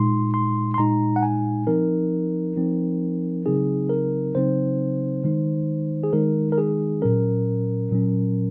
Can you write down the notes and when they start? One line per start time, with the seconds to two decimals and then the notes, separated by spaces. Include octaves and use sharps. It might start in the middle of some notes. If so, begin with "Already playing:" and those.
Already playing: A#2 G#3 D#4 C6
0.34 C6
0.74 C6
0.78 A#2 G#3 D#4 A#5
1.16 F#5
1.23 G#5
1.67 F3 C4 D#4 A#4
2.56 F3 C4 D#4
3.45 C#3 F#3 C4 D#4 G#4
3.89 A#4
4.35 C#3 F#3 C4 D#4 C5
5.24 D#3 G#3 D#4
6.04 G#4
6.13 D#3 G#3 D#4 A#4
6.52 A#4
6.58 G#4
7.02 A#2 F#3 C#4 A#4
7.91 A#2 F#3 C#4